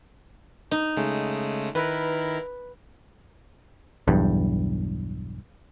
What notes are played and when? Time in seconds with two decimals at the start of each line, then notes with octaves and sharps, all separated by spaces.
0.71 D#4
0.97 C#3 G#3 A3
1.75 D#3 E4 A#4 B4
4.08 B1 E2 G2